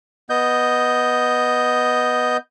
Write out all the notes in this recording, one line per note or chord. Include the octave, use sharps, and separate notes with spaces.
B3 D#5 G6